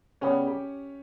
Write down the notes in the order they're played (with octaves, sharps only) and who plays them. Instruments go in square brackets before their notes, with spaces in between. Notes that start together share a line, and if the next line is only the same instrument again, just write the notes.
[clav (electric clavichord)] C#3 G3 B3 [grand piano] C#4 C#5
[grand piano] G4